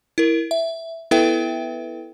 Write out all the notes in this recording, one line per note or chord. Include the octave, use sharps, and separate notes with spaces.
E4 A#4
E5
B3 E4 A4 B4 E5 G5